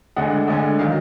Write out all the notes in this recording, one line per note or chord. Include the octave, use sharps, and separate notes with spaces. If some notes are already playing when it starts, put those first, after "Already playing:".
D2 D3 G#3 F#5
D2 D3 G#3
D#3 F#3 F5